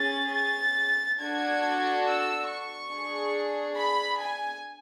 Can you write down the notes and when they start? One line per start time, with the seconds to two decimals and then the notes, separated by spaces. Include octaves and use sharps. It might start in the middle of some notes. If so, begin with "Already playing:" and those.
Already playing: C#4 G#4 A6
0.34 A6
1.19 D4 F#4 A4 G#6
2.05 E6
2.47 C#6
2.90 D4 G#4
3.76 B5
4.18 G#5